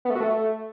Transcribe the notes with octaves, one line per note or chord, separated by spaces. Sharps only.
B3
A3
F#4
A3